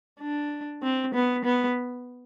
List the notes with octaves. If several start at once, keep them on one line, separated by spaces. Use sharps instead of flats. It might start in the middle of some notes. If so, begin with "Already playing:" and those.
D4
C4
B3
B3